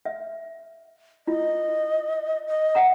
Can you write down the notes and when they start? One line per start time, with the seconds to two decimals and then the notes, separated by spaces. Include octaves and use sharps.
0.05 E5
1.27 E4 F4 D#5
2.48 D#5
2.75 E5 F#5 A#5